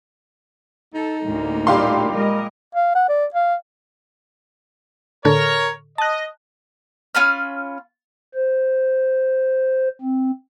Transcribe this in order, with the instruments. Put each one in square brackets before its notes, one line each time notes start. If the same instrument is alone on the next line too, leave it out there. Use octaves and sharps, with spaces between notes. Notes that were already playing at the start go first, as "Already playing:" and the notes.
[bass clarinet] D#4 [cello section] A4
[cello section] D2 A2 A#3
[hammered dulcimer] A#2 G3 B5 [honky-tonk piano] G4 F5 C6
[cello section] G#3 A#4 D#5
[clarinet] F5
F#5
D5
F5
[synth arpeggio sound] A2 D3 A4 [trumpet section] A#4 C#5
[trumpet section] D#5 [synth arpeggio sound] A5 F#6
[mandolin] C#4 F4 B5 F6
[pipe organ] C5
C4